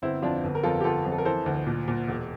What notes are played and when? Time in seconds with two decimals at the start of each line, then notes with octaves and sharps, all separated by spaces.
0.02 G1 C4 E4
0.22 F2 D4 F4
0.44 G1
0.55 A#4
0.63 F2 F4 A4
0.81 G4
0.84 G1 F4 A4
1.05 F2
1.11 A4
1.18 A#4
1.25 E3 A4 C5
1.46 D2
1.67 A#2
1.88 A#2
2.08 E1